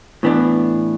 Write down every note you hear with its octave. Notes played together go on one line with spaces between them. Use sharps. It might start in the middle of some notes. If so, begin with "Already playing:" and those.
A2 E3 B3 D4